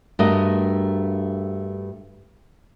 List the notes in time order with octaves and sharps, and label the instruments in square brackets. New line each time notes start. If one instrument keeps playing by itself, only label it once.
[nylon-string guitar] G2 A3 F#4 A#4 D#5